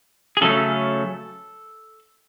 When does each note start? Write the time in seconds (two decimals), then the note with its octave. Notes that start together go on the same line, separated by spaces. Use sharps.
0.37 G#4
0.41 C#3 F#3 A3 C#4 A4